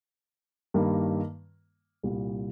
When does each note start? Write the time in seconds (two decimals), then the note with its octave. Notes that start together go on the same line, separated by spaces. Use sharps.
0.74 G2 D#3 G3 A#3
2.03 C2 A#2 G3